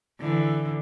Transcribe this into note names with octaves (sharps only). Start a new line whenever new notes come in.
D3 E3